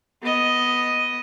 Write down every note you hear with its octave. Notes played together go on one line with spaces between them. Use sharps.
B3 D#5